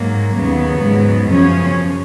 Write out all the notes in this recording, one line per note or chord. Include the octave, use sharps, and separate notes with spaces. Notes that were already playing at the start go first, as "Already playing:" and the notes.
Already playing: G#2 F#3 A#3
D#2 C#3 F#3 B3
G#2 F#3
F#2 C#3 F3 C#4